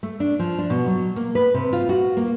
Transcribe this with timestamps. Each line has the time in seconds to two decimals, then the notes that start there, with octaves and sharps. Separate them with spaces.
0.03 A3
0.20 D4
0.39 F3
0.58 D4
0.70 B2
0.86 F#3
1.16 A#3
1.35 B4
1.54 C3
1.73 F4
1.89 F#4
2.17 A#3